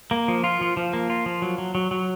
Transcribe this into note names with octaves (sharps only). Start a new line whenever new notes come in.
A#3
F3
F4
F3
F3
A#3
F4
F3
F#3
F#3
F#3
F#3